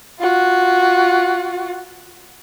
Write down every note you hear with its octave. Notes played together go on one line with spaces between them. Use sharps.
F4 F#4